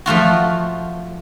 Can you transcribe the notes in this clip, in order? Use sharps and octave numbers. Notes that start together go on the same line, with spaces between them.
F3 A3 F4 F#4